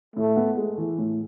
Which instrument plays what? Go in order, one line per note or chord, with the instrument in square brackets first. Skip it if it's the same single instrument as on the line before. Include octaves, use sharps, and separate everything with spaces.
[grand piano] A2 [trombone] A3
[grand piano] B3
G#3
E3
A2